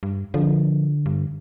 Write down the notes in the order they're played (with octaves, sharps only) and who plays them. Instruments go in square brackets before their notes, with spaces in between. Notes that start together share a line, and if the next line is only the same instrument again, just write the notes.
[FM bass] G2
[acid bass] D3 [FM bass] F3
[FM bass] G2